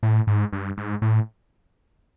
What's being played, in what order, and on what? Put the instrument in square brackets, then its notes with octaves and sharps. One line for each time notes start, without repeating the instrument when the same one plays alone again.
[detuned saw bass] A2
G#2
G2
G#2
A2